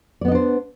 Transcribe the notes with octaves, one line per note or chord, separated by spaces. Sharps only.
B3 D4 C5 D5 D#5